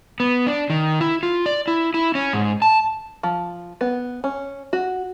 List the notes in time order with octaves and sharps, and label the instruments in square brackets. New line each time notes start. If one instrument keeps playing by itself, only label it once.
[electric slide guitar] B3
D4
D#3
E4
F4
D5
E4
E4
C#4
G#2
A5
[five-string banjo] F3
B3
C#4
F#4